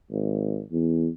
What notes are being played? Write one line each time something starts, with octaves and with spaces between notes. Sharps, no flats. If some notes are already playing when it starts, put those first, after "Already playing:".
G#1
E2